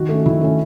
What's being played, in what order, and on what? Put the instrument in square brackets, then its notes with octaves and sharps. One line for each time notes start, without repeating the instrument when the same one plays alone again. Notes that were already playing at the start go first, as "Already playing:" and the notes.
Already playing: [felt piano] D#3 F#4
A3 C#4
D#3 E4
A3 C#4